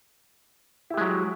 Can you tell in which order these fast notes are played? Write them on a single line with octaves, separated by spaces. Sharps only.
E4 G4 G#3 F#3